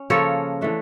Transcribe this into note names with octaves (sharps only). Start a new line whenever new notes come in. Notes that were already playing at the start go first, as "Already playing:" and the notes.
Already playing: C#4
C#3 F3 A#3 A4 C#5
E3 A3 D4